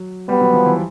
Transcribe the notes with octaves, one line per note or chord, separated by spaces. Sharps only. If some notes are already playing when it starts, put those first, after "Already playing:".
Already playing: F#3
G3 B3
F#3
F3
E3